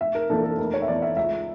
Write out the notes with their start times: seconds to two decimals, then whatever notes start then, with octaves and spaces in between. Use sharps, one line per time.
0.01 F1 E5
0.15 A#4
0.29 F2 E3 A#3 D4 A4
0.44 A4
0.58 F1 A#4
0.74 C#5
0.82 E5
0.88 E2 E3 A3 D5
1.02 E5
1.17 C#2 E5